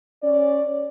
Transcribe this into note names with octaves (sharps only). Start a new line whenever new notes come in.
C#4 D5